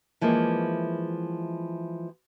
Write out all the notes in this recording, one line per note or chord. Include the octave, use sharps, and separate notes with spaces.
E3 F3 G#3 A#3